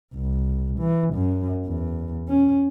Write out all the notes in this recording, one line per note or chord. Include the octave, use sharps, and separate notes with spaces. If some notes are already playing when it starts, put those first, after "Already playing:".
C2
E3
F#2
E2
C#4